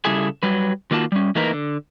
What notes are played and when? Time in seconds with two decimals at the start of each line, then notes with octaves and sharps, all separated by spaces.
0.05 C#3 G3 E4 G#4 A4 G#5
0.43 F#3 G3 B4
0.91 D#3 A#3 F4 F#4 A5
1.12 G3 C#4
1.35 E3 A3 A#3 D#4 A#4 B4
1.53 D3